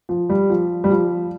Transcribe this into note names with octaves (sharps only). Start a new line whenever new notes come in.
F3
G3
F3
G3
F3